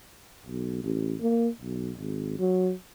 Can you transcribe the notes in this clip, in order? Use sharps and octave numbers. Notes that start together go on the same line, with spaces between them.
B1
A1
A#3
B1
G#1
F#3